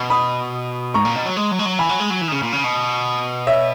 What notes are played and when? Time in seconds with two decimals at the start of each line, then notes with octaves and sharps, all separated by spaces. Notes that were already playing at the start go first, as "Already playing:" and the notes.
Already playing: B2
0.10 B5 D#6
0.94 G#2 A#5 C#6
1.05 A#2
1.15 B2
1.26 F#3
1.37 G#3
1.51 F#3
1.59 G#3
1.65 F#3
1.79 E3 G#5 B5
1.89 F#3
2.00 G#3
2.10 F#3
2.21 E3
2.28 D#3
2.32 C#3
2.43 A#2
2.52 C#3
2.64 B2
3.47 C#5 E5